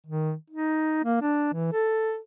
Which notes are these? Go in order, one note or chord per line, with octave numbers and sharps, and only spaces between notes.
D#3
D#4
A#3
D4
E3
A4